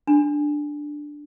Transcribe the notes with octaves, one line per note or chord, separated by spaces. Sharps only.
D4